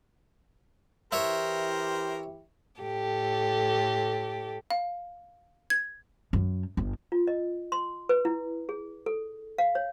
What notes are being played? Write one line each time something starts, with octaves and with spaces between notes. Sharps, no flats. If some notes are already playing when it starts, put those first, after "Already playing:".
E3 E4 G4 A#4 C5 C#5 E5
A2 G4 A4
F5
G#6
F#2
G1
F4
D#5
C6
B4
E4
G#4
A4
F5
C#5